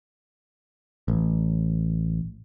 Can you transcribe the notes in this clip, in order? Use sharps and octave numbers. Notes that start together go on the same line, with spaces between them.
A1